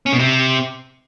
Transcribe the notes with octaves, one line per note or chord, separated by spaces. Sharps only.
C#4
B2
C3